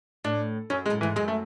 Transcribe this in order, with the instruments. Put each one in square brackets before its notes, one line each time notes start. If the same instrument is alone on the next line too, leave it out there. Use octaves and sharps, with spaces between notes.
[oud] A2 [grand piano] D4
[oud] F#2 [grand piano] C#4
[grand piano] G#3
[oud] A2
[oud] G#2 [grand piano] E3
[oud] F#2 [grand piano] G#3
[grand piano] A3